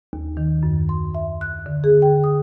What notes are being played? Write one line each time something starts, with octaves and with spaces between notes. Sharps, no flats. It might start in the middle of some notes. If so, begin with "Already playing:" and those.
D#2
D#3
F#2
C6
E5
F#6
D3
G#4
G5
D#6